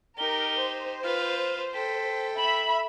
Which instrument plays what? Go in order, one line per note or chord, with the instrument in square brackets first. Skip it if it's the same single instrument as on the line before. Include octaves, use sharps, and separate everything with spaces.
[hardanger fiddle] D#4 G4 [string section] A#4 [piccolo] G7
[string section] C5
[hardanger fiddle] F4 B4 [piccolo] F6
[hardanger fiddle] A4 G5 [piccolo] B6
[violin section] E5 B5 [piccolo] F#7